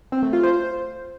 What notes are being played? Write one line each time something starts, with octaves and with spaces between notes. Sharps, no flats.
C4
A3
F4
C5